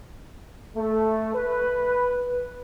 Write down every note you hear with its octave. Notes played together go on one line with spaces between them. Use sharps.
A3
B4